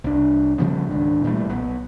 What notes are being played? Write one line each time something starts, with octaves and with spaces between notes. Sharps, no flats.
C2 D4
C#3 F3 G3 B3
C#2 G#2 D#3 D4
A#2 E3 G3 A3
B1 B3